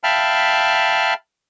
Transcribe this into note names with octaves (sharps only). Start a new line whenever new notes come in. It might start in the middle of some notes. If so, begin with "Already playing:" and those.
E5 F5 G5 A5 B5 F6